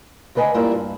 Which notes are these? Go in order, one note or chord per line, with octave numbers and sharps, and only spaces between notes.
D2 C#3 B4 D#5 G#5
G3 A#3 E4 F4
G2